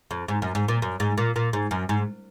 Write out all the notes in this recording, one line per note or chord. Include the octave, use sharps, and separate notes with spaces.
F2
G#2
F#2
G#2
A#2
F#2
G#2
A#2
A#2
G#2
F#2
G#2